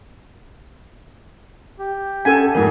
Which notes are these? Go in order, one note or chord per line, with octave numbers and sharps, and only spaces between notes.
G4
C#4 A4 F#5 G#5 B6
F2 G#2 A#4 F#5